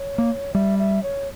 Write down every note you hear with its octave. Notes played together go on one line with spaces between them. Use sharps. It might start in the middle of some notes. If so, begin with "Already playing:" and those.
Already playing: C#5
A#3
G3 E5
E5
C#5